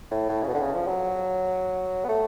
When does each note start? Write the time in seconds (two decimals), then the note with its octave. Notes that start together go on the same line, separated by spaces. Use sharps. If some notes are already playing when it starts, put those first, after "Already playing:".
0.11 A2
0.29 A2
0.42 C#3
0.47 B2
0.54 D3
0.61 C#3
0.74 F3
0.88 F#3
2.04 B3
2.09 A3